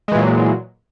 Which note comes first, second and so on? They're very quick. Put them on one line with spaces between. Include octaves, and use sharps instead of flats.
G#3 E3 A#2 F#3